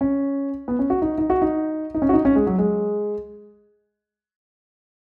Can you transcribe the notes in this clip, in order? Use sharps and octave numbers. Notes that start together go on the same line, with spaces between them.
C#4
B3
C#4
F#4
D#4
D#4
F#4
D#4
D#4
C#4
F#4
D#4
C#4
G#3
F#3
G#3